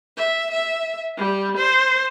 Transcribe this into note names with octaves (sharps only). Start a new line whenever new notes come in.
E5
E5
G3
C5